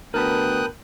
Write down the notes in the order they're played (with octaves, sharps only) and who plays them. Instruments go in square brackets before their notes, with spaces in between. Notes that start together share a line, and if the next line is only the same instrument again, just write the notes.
[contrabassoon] D2 [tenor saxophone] B3 [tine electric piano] A#4 A5 B5 [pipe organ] G5 D#6 F#6